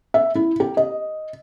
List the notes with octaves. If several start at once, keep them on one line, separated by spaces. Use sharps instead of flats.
E5
E4
G4
D#5